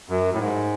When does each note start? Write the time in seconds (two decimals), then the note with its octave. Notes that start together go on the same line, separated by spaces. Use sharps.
0.09 F#2
0.34 A2
0.39 G#2